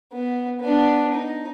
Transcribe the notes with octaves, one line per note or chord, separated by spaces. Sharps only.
B3
B3 D4
D#4